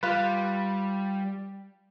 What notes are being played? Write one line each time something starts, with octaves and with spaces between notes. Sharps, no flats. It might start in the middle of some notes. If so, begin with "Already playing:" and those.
G3 F4 B4